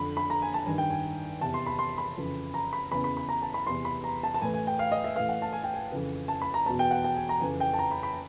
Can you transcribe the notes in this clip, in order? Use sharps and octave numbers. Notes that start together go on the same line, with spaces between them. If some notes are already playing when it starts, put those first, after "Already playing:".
Already playing: F2 D3 B5
B5
A#5
G#5
A5
G2 D#3 G#5
G5
G#5
E2 C3 E3 A5
C6
B5
C6
B5
F2 C#3 E3
A#5
B5
E2 C#3 E3 B5
B5
B5
A#5
A5
B5
E2 C3 E3 C6
B5
A#5
A5
A5
A2 E3 G#5
G#5
G5
F5
D#5
E5
A2 E3 F5
F#5
A5
G#5
G5
G#5
F2 C#3 E3
A5
B5
A#5
E2 B2 A5
G5
F#5
G5
G#5
A#5
F2 C#3 E3 G#5
G5
A5
A#5
B5
B5